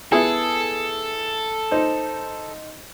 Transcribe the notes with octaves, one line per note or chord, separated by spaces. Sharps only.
B3 E4 G#4 A4
D#4 C5